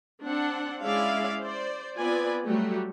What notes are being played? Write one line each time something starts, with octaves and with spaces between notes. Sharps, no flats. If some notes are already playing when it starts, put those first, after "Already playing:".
C4 D4 F#5
G#3 C#4 E4 D5 E5 F5
C5 D5
B3 C4 F4 B4 D5 G#5
F#3 G3 A3 F#4 G4